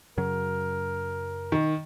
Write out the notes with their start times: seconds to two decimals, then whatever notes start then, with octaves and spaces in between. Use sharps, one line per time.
0.17 F#2 C#3 F#3 A#4
1.52 D#3